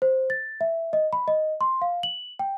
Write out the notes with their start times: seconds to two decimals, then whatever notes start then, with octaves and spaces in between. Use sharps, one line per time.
0.02 C5
0.30 A6
0.61 E5
0.93 D#5
1.13 B5
1.28 D#5
1.61 C6
1.82 F5
2.03 F#7
2.39 G5